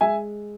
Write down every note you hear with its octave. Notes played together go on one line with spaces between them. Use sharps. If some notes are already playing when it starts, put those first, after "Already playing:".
G#3 E5 G#5